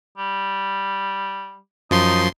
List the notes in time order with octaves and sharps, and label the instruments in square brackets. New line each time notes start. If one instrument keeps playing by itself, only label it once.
[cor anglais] G3
[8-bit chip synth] F#2 F3 C6 [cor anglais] D#4